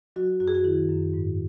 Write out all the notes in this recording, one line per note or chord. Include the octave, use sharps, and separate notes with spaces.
F#3 F#4
F#2 F#4
G#4
F#4
D#3 E4
F#2
G#2